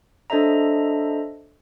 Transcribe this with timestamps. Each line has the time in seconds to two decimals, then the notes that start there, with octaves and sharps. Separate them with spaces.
0.30 D4 A4 C5 D#5 E5 A#5